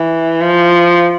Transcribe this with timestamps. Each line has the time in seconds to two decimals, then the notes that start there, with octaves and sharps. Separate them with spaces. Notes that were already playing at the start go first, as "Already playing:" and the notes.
Already playing: E3
0.41 F3